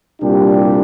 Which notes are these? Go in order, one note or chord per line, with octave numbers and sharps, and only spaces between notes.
C2 A#2 G3 D4 G4